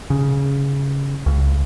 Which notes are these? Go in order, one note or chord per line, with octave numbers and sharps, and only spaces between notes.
C#3
C#2